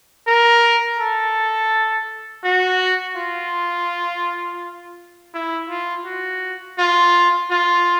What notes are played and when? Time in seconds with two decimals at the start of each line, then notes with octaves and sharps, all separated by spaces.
0.27 A#4
0.99 A4
2.44 F#4
3.17 F4
5.34 E4
5.69 F4
6.05 F#4
6.79 F4
7.50 F4